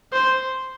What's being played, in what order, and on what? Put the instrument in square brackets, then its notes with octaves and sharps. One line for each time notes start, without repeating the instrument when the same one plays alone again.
[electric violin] C5